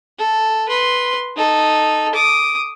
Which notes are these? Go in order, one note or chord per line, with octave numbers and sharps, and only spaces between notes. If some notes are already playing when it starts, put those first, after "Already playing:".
A4
B4 C6
D#4 A4
D6 D#6